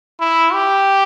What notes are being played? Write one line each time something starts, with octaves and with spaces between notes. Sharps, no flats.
E4
G4